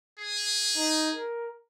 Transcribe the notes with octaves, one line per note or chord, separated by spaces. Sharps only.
G#4
D#4
A#4